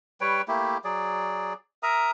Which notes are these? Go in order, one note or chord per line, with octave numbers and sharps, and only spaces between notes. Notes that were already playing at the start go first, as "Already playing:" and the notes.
G3 B4 C#5 G5
A3 A#3 E4 G4
F#3 G#4 D5
A#4 E5 A#5 D#6